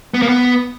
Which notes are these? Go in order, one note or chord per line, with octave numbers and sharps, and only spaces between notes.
B3
A#3
B3